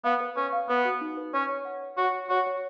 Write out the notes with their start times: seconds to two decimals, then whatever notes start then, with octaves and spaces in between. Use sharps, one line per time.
0.04 B3 F5
0.20 B4
0.36 C#4 B4
0.53 F5
0.69 B3 B4
0.85 F#4
1.01 D#4
1.17 B4
1.34 C#4 C#5
1.49 C#5
1.65 F#5
1.82 C#5
1.97 F#4 C#5
2.15 C#6
2.30 F#4 C#5
2.46 C#5